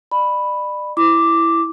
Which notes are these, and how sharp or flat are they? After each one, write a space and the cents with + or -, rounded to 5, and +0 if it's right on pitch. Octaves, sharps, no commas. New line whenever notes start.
D5 +35 B5 +0
E4 +5 D6 +0